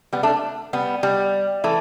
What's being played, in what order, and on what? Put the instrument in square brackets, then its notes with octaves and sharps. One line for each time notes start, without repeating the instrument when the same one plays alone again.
[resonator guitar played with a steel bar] G3 B3
A3 D4
G3 B3
G3
E3 A3